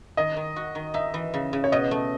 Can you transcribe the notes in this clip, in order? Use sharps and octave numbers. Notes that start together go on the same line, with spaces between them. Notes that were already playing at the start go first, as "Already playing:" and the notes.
D#3 D#5
D#3
F#4
D#3
D#4 E5
E3
C#3
C#3
C#5
B2 D#5
A3